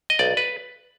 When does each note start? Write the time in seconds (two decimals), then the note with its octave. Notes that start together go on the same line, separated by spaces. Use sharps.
0.10 D#5
0.19 B1 D5
0.37 B4